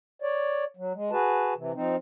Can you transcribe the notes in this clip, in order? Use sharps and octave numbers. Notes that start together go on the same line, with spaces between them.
C#5 D5
F#3
G#3
F#4 G#4 B4 A5
C3 E3
F3 C4 D#4